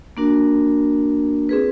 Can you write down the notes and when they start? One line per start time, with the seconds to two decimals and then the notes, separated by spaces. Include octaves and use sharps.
0.17 A#3 D4 F#4 A#4
1.49 C4 F4 G#4 B4